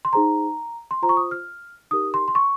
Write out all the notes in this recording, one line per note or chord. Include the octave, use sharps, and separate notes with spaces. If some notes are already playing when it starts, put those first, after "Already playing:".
C6
D#4 G#4 C5 A#5
C6
F4 C5 A#5
C#6
D#6
F6
D#4 G4 A#4 D#6
C6
C6
C#6